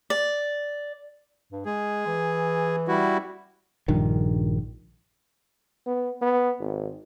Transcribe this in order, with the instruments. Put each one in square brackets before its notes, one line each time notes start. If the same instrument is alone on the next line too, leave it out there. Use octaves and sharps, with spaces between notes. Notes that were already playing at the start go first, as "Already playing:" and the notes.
[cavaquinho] D5
[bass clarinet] G2
[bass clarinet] G#3 [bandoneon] G#4
[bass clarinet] E3
[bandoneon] G3 E4 F#4
[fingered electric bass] A#1 G2 D#3
[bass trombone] B3
B3
G#1